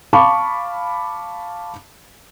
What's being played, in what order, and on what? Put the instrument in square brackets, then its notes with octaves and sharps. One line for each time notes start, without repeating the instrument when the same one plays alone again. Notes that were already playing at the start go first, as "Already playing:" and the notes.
[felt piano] F5 A5 B5 C#6 D6